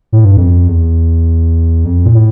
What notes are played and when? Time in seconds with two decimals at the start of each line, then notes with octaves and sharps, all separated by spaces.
0.13 A2
0.25 G2
0.37 F2
0.67 E2
1.85 F2
2.06 A#2
2.14 A2